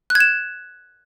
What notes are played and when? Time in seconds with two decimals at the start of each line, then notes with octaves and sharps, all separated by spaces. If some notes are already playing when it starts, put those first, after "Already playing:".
0.10 F#6
0.15 G#6
0.20 E7